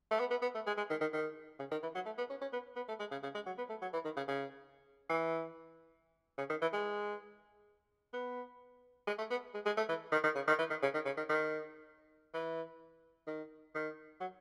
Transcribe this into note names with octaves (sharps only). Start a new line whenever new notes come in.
A3
B3
B3
B3
A3
G#3
G#3
D#3
D#3
D#3
C#3
D#3
E3
F#3
A3
B3
C#4
C#4
B3
B3
A3
G#3
C#3
C#3
G#3
F#3
B3
A3
F#3
E3
D#3
C#3
C#3
E3
C#3
D#3
E3
G#3
B3
G#3
A3
B3
G#3
G#3
A3
E3
D#3
D#3
C#3
D#3
E3
D#3
C#3
D#3
C#3
D#3
D#3
E3
D#3
D#3
F#3